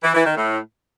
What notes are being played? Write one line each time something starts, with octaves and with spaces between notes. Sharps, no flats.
E3
E3
D#3
A2